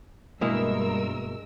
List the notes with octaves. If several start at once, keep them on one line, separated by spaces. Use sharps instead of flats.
G2 B2 G#3 A#3 E4 A#4 E6